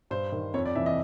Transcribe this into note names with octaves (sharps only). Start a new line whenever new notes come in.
G2 C5
D#3
F2 C#5
D5
C3 E3 E5
D#5